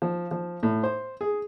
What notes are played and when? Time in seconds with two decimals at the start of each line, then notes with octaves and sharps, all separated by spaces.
0.02 F3
0.31 F3
0.63 A2
0.83 C5
1.21 G#4